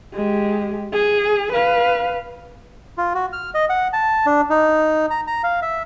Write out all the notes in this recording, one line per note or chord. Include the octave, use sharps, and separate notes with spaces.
G#3 G4
G#4
B4 F5
F4
F#4
F6
D#5
F#5
A5
D4
D#4
A#5
A#5
F5
E5